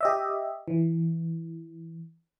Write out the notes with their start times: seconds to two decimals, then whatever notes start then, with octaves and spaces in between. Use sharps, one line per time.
0.01 G4 D#5 E5
0.68 E3